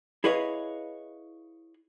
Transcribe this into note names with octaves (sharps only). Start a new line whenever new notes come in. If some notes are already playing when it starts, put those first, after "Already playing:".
E4 G#4 B4 C#5 D#5 F5